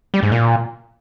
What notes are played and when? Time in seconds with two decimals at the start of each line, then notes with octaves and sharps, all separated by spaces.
0.14 G3
0.23 G#2
0.32 A#2